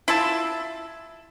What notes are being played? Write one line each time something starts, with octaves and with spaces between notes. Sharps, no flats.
E4 F4 E5 A5